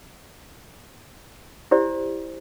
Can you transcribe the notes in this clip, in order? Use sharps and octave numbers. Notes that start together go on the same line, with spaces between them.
E4 G4 C5 D5